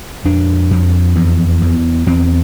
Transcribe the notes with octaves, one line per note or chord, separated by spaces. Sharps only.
F2 D4
F2
E2
E2
E2 C4